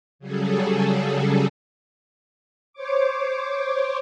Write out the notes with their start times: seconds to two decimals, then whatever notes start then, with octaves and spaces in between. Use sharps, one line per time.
0.19 C#3 F#3 G3 G#4 A4
2.73 C5 C#5 D6